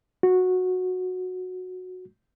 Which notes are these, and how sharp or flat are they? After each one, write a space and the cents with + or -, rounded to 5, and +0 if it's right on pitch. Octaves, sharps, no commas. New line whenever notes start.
F#4 -10